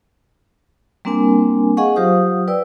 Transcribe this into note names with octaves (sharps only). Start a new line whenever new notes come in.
G3 A#3 C4 D4 A#4 G#5
G#4 D#5 F5 F#5 G#5 C#6
F#3 F4 G4 C5 F5 D#6
B4 D5 G5 E6